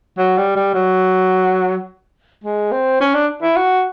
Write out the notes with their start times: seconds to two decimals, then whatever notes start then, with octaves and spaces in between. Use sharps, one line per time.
0.18 F#3
0.38 G3
0.56 G3
0.74 F#3
2.44 G#3
2.72 C4
3.00 C#4
3.14 D4
3.42 E4
3.56 F#4